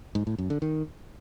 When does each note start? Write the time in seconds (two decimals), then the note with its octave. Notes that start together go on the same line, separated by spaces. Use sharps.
0.15 G#2
0.27 A2
0.38 F#2
0.50 D3
0.62 D#3